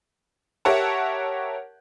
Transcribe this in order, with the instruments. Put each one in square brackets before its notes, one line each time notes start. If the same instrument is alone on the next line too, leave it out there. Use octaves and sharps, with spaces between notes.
[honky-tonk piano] G4 A#4 C#5 E5 F#5 A5